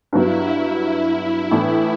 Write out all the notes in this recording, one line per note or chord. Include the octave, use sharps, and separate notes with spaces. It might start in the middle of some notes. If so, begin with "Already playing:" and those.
G2 F#3 B3 E4
A2 E3 B3 D4 E4